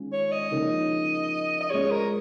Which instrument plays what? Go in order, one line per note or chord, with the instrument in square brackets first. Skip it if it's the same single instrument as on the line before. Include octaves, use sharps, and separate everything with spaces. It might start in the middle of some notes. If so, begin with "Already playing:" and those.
Already playing: [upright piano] D#3 G#3 C#4 F4
[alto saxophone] C#5
D#5
[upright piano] C#3 F3 A#3 D#4 A#4
[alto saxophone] D#5
[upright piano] G#3 C#4 F4 G#4 [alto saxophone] C#5
[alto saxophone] A#4